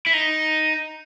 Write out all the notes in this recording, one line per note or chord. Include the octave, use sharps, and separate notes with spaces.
E4
D#4